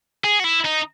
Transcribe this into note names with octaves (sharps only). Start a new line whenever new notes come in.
G#4
F#4
E4
D#4